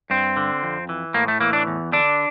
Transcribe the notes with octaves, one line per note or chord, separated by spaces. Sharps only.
G2 C4
D3
F2
E3
A2 A#3
A3
E3 A#3
D4
E2
D3 D4